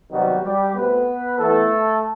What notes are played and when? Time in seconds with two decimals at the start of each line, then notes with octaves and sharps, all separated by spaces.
0.10 C3 D#3 F#3 G3 B3 F#4
0.42 G3 G4
0.74 B2 A3 B3 C4 B4
1.38 E3 A3 B3 A4